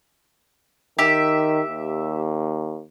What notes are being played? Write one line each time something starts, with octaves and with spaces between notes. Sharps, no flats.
D#3 G4 E5
D#2